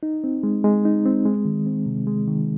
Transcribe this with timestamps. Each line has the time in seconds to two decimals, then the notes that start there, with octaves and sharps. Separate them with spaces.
0.03 D#4
0.24 C4
0.43 G#3
0.64 G#3
0.85 D#4
1.06 C4
1.26 G#3
1.45 D#3
1.66 C4
1.86 C3
2.07 G#3
2.28 D#3